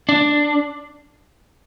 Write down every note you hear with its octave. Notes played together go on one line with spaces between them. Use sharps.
D4